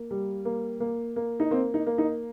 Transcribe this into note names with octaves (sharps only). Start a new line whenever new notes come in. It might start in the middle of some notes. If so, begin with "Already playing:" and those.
Already playing: A#3
G3
A#3
A#3
A#3
D#4
A#3 C4
D#4
A#3
D#4